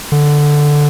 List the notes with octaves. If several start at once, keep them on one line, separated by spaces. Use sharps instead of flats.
D3